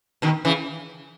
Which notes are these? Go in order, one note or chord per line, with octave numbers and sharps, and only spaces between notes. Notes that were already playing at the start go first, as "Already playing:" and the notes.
B2 D#3
C#3 E3